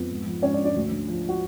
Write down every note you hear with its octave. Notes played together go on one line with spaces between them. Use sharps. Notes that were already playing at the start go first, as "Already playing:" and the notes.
Already playing: F2 B3
G#2
F3
G#2 C#4 C#5
D4 D5
F3
D4 D5
D2
D3
F3
F#4